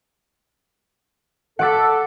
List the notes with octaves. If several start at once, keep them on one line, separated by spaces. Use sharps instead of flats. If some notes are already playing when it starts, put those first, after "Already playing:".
A4 F#5 D6 B6